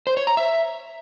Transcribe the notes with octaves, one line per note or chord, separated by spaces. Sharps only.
C5
C#5
A#5
E5